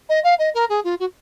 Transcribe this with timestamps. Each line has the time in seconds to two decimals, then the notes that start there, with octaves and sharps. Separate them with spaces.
0.09 D#5
0.24 F5
0.38 D#5
0.54 A#4
0.69 G#4
0.84 F4
0.99 F#4